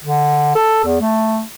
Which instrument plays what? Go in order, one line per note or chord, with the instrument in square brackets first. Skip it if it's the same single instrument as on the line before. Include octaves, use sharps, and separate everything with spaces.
[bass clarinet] D3
A4
E2
A3